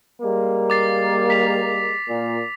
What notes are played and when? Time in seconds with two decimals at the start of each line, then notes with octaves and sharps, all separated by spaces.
0.22 G3 G#3 A#3
0.70 D6 A6 C7
1.30 B6 F7
2.09 A#2